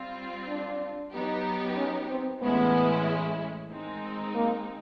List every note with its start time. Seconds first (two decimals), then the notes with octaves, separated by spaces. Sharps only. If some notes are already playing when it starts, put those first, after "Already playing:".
Already playing: G3 C4 F4
0.48 D4
1.12 F#3 B3 D#4 G4
1.77 C#4
2.10 C4
2.41 A2 E3 G#3 B3 C#4 E4
3.71 D#3 G#3 C4 D#4
4.35 A#3